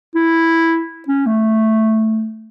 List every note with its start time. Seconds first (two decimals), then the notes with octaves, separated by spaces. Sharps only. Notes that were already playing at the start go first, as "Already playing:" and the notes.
0.15 E4
1.08 C#4
1.26 A3